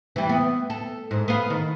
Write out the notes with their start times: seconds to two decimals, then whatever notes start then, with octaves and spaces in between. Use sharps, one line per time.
0.16 E3 G3
0.29 B3
0.70 A4
1.11 G#2
1.28 B3 F5
1.50 D#3